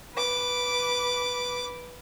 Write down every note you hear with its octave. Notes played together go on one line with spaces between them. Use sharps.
B4 D6